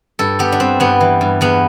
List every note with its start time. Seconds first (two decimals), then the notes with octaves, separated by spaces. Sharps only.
0.19 G2 A4
0.39 B3 G4
0.52 D4
0.60 G3 C4
0.80 G2 B3
1.01 E3
1.21 G2
1.41 E2 B3